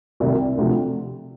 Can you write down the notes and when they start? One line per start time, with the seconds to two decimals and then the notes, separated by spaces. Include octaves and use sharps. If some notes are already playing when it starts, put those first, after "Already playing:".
0.20 C2 C3 D#3 G3 D5
0.57 D2 C3 F3